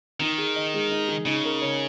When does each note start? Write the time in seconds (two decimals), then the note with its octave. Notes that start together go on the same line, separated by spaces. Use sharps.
0.20 D#3 D#4
0.38 G#4
0.56 D#5
0.74 G#3
0.91 D#4
1.08 G#4
1.26 C#3 D#4
1.44 A#4
1.62 C#5